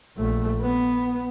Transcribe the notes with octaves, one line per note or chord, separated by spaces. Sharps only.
A#1 A3
B3